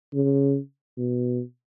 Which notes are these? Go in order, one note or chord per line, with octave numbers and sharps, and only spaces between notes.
C#3
B2